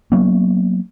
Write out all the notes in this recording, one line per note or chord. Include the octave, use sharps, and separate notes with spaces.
F#3 A#3 B3 C#4